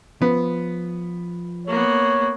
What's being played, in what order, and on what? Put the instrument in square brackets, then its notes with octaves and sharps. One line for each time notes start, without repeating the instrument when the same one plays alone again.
[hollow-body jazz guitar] F3 [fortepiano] B3
[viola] A#3 B3 [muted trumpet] C#5